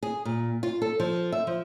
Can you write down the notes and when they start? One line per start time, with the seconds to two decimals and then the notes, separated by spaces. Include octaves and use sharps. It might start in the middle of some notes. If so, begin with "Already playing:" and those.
0.03 G#4
0.25 A#2
0.63 F4
0.82 A4
1.00 F3
1.32 E5
1.47 F3